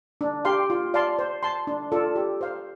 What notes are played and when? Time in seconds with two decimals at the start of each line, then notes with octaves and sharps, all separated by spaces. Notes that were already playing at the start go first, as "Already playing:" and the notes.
0.21 D4
0.45 G4 F5 C6
0.70 F4
0.94 D5 F5 A5 C6
1.19 C5
1.43 A5 C6
1.67 D4
1.92 F4 A4 D5
2.16 G4
2.41 C5 F5